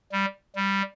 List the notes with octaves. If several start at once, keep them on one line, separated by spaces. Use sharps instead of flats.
G3
G3